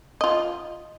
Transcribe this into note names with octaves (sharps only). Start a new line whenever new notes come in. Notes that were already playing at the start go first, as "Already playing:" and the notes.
F4 D#5